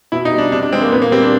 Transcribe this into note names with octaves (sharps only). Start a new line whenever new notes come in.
B2 E4
D#4
G3
D4
C3 D4
D4
E3 G#3 C4
A#3
A#2 B3
A#3
G3 C4
D4